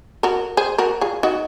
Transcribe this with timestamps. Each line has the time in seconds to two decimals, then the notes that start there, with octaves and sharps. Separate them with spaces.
0.23 F#4 A#4
0.57 G#4 C5
0.78 F#4 A#4
1.01 F4 G#4
1.23 D#4 F#4